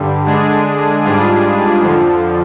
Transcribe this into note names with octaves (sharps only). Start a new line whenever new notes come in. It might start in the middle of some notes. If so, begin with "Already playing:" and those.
Already playing: G2 D3 G3
D3 G#3 D4 G#4
G#2 G3 D4 F4 G#4
F2 D3 F3